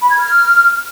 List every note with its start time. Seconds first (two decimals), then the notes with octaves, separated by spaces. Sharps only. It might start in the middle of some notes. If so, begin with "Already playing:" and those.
0.02 B5
0.10 G#6
0.19 F6